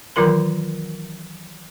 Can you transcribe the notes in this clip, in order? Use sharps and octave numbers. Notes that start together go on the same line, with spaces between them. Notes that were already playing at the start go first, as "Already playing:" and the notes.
D#3 E3 F#3 F4 A#4 C6